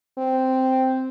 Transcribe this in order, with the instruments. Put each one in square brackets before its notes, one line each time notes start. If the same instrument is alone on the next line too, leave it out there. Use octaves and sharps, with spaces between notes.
[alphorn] C4